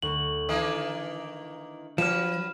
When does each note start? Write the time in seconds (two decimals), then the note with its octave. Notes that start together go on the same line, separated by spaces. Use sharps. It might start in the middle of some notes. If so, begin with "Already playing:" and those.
0.02 D2 C#6 F#7
0.49 D#3 E3 A#3 D4 D#6
1.98 F3 F#3 B4 F6 E7